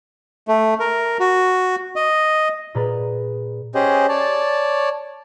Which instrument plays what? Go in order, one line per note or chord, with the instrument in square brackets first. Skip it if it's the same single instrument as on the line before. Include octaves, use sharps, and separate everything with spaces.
[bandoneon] A3
A#4
F#4
D#5
[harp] A#2 G#4 B4 D5 A#5 B5
[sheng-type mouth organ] C#4 G4 G#4 C5 D#5
C#5 D5 A5